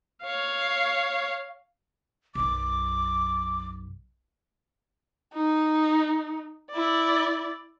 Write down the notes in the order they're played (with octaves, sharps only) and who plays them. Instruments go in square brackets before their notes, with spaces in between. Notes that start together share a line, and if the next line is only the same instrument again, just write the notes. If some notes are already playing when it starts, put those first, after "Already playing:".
[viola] C#5 F5
[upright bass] B1 F#2 [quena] D6
[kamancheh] D#4
E4 D5